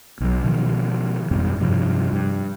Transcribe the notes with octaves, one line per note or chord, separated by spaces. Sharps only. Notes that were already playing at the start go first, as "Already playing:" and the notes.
B1 F#3
B2 D#3 F3
F2 G#2 B2 G3
G2 C3 F3
G2